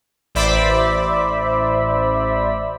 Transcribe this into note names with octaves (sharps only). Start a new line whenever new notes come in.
A1 C5 D5 E5 B5